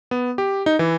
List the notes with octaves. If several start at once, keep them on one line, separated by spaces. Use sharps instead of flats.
B3
G4
D#4
E3